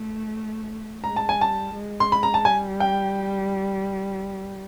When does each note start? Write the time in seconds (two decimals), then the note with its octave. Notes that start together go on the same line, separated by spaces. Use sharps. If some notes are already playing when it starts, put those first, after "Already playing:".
Already playing: A3
1.04 G#3 A#5
1.16 A5
1.29 G#5
1.39 G3 A5
1.74 G#3
2.00 C6
2.12 B5
2.23 A#5
2.34 A5
2.45 G3 G#5
2.80 G5